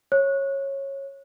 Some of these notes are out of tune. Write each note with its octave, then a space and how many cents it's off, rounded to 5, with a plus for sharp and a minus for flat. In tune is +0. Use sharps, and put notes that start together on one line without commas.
C#5 -15